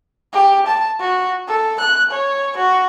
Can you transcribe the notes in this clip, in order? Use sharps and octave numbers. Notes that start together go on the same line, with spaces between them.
G4
A5
F#4
A4
F#6
C#5
F#4